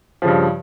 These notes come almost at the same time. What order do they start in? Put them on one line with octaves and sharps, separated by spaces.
F3 C#3 G2